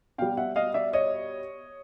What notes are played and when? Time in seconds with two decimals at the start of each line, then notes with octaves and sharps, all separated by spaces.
0.18 B2 G3 F5 G5
0.37 E5 F#5
0.56 D#5 F5
0.74 D5 E5
0.93 C#5 D#5